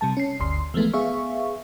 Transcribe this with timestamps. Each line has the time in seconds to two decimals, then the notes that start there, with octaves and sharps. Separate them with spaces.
0.01 C3 G3 A5
0.17 C#4 C7
0.39 G1 D2 C6 C7
0.74 E3 F3 G#3 A3 B3
0.93 B3 G#4 E5 F5 C#6